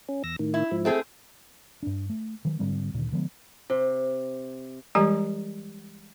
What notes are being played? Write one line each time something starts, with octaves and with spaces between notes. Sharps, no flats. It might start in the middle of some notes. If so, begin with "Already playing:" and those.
C#4
E2 E6 A#6
A2 D#3
E4
G#2 F3
A3 C4 G#4
G2 D4
A3
D#3 F#3
G#2 D3 G3 C4
D2 A#2 D3 D#3
D3 F3 G#3 B3
C3
E3 G3 G#3 G4 G#5 A#5